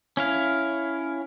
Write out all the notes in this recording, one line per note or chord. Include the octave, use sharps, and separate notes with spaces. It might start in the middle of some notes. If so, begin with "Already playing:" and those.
C#4 E4 F5